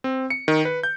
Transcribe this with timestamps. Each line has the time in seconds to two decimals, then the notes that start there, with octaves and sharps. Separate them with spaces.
0.04 C4
0.30 C#7
0.48 D#3
0.65 B4
0.83 G6